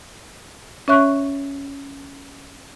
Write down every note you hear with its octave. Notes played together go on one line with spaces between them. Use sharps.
C#4 C#5 E5 C#6 F#6